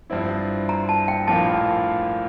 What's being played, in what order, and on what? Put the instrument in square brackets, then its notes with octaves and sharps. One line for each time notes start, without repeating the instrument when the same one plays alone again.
[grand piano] G2 F3 C4 E4
[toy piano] A#5
A5
G5
[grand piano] A#1 A2 F3 A#3 F4 [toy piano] A5